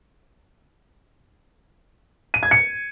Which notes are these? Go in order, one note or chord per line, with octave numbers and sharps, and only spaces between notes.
D#7
G#6
C#7